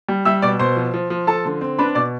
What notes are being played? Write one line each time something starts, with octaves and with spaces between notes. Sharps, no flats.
G3
G3 E5 E6
B2 D5 D6
B2 C5 C6
F3
F3
F3
F3 A4 A5
D3
C4
D4 B4 B5
B2 D5 D6